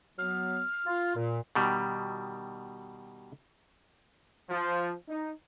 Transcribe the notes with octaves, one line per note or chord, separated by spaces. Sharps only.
F#3 B3 F6
F4
A#2
B2 D#3 G3
F3
D#4